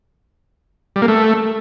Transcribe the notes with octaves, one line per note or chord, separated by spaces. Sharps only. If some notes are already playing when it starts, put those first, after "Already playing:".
G3
A#3
A3